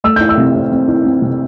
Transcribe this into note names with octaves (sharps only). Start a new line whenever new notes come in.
A3 E6
E4 G6
E6
C3
C4
C4
E4
C4
C3